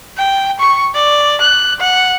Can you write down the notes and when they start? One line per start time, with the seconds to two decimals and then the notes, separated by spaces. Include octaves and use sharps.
0.18 G5
0.59 C#6
0.94 D5
1.41 F#6
1.80 F#5